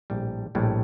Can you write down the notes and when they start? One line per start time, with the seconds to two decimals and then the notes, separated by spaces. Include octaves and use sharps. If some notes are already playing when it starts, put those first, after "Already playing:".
0.10 A#1 A2 G3
0.55 A#1 A2 G3